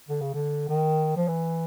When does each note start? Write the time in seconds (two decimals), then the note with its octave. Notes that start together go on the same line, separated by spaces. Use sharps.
0.09 D3
0.21 C#3
0.34 D3
0.69 D#3
1.17 F3
1.28 E3